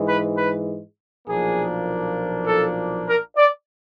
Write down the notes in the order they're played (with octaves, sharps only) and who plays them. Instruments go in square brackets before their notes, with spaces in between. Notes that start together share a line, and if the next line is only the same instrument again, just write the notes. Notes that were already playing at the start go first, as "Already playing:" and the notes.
Already playing: [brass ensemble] G#2 E3 G#3
B4
B4
B1 A#2 F3 A#3 D4 G#4
A4
A#4
D5